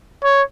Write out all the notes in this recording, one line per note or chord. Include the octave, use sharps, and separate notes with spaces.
C#5